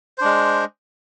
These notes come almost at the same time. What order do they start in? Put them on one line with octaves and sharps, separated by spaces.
C5 D4 G#3